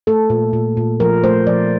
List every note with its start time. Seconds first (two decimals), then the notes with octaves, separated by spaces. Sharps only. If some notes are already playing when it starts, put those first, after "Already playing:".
0.07 A3 A4
0.30 A#2
0.53 A#2
0.77 A#2
1.00 F3 A#4
1.24 A3 C5
1.47 F3 D5